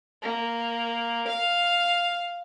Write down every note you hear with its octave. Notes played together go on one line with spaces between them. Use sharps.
A#3
F5